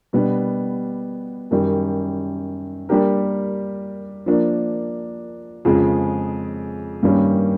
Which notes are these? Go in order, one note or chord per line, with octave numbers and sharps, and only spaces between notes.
B2 G3 B3 D4
F#2 D#3 G3
G3 A#3 D4 G4 A#4
F3 A#3 D4
F2 C#3 F3 G#3
G2 D#3 G3 A#3 C#4